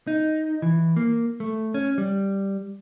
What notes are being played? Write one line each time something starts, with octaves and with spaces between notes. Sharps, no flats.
D#4
E3
A#3
A3
C#4
G3